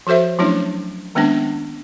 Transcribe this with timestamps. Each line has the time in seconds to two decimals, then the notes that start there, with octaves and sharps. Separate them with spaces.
0.07 F3 F#4 A4 C5 E5
0.38 F3 F#3 A3 C#4 D4 E4
1.15 D#3 G#3 A#3 B3 C#4 D4